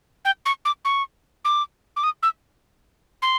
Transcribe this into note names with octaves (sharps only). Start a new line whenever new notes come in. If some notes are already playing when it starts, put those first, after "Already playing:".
G5
C#6
D6
C#6
D6
D6
D#6
E6
C6